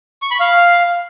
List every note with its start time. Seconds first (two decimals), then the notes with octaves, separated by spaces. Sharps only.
0.22 C#6
0.31 B5
0.40 F5